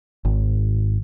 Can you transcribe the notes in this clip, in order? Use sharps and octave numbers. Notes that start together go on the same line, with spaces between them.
G#1